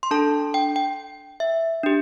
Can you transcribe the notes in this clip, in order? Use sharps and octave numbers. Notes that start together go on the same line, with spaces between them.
C6
D4 A4 A5
G5
G5
E5
D4 G4